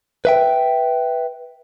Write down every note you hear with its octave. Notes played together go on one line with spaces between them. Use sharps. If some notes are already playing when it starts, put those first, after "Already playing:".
B4 E5 G5